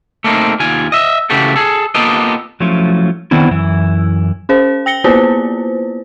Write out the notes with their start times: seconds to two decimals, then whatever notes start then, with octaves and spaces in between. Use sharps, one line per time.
0.24 A3 A#3 C4 D#4
0.60 D#2 F4 G#5
0.92 D#5 E5
1.30 C#3 E3 A3 F#4 G4 A4
1.56 G#4 A4
1.95 A#3 B3 F4 G4 A4 D#5
2.60 F3 F#3 A3 C#4 E4 F4
3.31 D#3 B3 C4 D4 E4
3.51 F#2 E3 E4
4.49 C#4 G#4 C5
4.86 G5 A#6 C#7 G7
5.04 A#3 B3 E4 F4 B4 C5